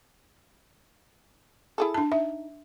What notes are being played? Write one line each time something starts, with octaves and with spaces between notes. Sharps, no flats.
E4 G#4 A4
D4 A5
D#4 E5